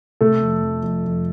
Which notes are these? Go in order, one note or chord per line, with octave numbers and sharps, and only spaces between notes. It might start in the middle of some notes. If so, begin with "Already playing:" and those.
C3 A3 A4
F2
F2
F2
F2